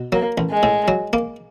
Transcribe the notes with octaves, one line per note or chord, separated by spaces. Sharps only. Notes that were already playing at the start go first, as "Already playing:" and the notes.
Already playing: B2
F#3 A#3
A1
G#3
A2
F#3
A#3